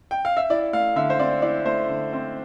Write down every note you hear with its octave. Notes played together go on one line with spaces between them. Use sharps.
G5
F5
E5
E4 D5
A3 F5
D3 E5
C5
C4 D5
E4 D5
A3 C5
D3
C4